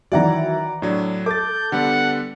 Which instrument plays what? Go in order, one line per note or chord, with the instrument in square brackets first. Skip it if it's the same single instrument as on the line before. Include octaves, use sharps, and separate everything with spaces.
[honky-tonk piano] D#3 E3 F#3 [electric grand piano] D5 F#5 A#5
[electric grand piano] A2 F#3 [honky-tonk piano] D4
[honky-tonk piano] A4 [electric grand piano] D6 A6 [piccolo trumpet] G6
[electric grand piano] D3 G3 B3 [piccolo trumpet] F#5